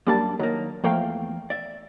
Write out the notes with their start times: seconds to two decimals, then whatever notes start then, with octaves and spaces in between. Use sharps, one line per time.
0.07 F#2 G3 A#3 D4 A5 D6
0.39 D#3 F#3 A#3
0.84 E2 F3 A3 A#3 F5 G5
1.50 D5 E5